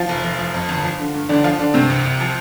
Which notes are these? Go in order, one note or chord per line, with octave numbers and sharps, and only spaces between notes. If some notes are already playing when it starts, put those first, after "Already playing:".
Already playing: F3 F4
F1
F1
F3
F2
G1
F3
D3
G2
G1 D3 D4
F3 F4
D3 D4
G2 C3 C4
C2
C2
F3